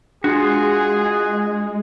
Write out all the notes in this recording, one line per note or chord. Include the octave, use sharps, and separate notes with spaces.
G#3 D4 F4 F#4 G#4